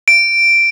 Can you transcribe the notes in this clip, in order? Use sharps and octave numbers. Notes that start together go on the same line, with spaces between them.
D7